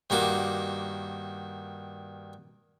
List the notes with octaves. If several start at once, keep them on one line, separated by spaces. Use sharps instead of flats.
G2 D#3 A#3 F#4 D6